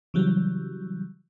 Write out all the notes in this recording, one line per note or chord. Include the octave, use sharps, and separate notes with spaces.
C#3 E3 F#3 G3